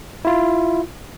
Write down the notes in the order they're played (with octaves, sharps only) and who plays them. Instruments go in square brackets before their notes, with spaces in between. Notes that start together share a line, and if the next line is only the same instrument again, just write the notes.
[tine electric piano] E4 F4